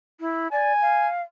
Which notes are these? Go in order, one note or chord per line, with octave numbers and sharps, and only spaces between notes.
E4
D5 G#5
F5